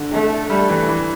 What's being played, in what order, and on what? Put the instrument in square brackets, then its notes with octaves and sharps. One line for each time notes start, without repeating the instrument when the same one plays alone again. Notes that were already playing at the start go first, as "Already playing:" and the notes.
Already playing: [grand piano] D3
[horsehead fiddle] A3
[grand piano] G3 [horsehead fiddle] A3
[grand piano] E3
E3